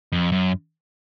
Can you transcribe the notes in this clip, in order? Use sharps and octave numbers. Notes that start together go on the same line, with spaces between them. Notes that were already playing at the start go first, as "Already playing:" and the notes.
F2
F#2